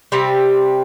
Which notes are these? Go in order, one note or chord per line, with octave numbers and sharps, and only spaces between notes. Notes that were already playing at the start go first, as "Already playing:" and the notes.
C3 G3 C4